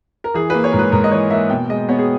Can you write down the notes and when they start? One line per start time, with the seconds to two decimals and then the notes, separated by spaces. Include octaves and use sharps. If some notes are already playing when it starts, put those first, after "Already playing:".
0.24 A#4
0.34 E3 G#4
0.50 A#3 B4
0.64 C#5
0.72 G#2 A#4
0.79 B4
0.92 G#2 A#4
1.04 D#5
1.11 E3 C#5
1.31 A#3 E5
1.50 B2 G5
1.69 G#3 D#5
1.89 B3 C#5
1.99 G#4